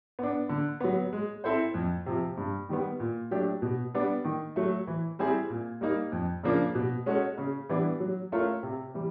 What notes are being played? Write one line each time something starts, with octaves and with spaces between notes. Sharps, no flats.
B3 D4
D3
F#3 B3
G#3
C4 E4 A4 C5
F2
C3 F3
G2
D#3 G3 B3
A#2
F#3 A3 D4 G4
B2
G3 B3 D4
D#3
F#3 A3
E3
G3 C4 E4 G#4
A#2
G3 A#3 D#4
F2
C#3 F3 A#3 D4
B2
G#3 C#4 F#4 A4
C#3
E3 G3 B3 D4
F#3
A3 C#4 F4 A#4
C3
E3 G3